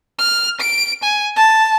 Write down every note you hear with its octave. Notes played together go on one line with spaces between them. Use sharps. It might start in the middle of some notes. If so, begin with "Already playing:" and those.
F6
D7
G#5
A5